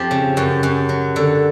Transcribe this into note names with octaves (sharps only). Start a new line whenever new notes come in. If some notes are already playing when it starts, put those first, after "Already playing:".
Already playing: F2 F3 G4
C#3
F#2
F#2
F#3
D3